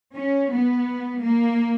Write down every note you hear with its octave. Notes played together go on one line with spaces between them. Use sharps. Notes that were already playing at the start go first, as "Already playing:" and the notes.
C#4
B3
A#3